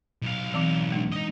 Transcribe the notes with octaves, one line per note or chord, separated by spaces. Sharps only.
B1 F5
E3 C4 D6
G#3 D4
D#4 D#5